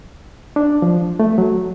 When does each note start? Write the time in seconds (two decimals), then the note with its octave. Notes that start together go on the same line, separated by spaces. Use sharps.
0.56 D4
0.82 F3
1.20 A3
1.38 F#3